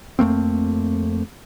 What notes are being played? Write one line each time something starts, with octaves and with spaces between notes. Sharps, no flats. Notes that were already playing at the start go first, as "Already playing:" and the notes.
F2 A3 A#3 C4